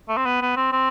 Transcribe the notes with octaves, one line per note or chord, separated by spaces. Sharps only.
A3
C4
B3
B3
C4
C4